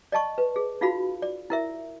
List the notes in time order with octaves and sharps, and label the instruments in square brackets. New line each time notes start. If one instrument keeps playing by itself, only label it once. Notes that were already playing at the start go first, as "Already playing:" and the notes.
[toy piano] D5 D#5 A5 C#6
B4
G#4
D#4 F4 F#4 F5 B5
D5
E4 A#4 E5